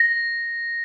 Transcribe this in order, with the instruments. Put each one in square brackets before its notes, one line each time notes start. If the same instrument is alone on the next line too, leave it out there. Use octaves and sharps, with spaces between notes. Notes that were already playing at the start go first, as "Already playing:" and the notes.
Already playing: [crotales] A#6